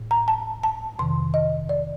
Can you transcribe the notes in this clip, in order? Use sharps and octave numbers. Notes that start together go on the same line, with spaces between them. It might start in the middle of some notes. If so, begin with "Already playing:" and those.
Already playing: A2
A#5
A5
A5
F2 C3 D#3 C6
D#5
D5